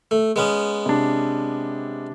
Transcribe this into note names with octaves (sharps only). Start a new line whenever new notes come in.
A3
G#3 B3 C#4
C3 D4